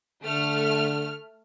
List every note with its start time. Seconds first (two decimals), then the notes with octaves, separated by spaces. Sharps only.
0.24 D3 A3 F6